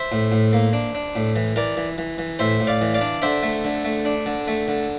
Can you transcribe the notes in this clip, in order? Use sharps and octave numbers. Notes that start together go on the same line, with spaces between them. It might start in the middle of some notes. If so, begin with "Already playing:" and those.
Already playing: C5 E5
A2
A2
A#3
D4
D4
A2
E3
E3 A#4 D5
E3
E3
E3
A2 C5 E5
A2
D5 F5
E3
D5 F5
D4
D3 C5 E5
A3
D3
A3
D4
D3
A3
D3